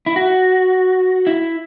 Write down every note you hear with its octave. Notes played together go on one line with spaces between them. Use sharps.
E4
F#4
E4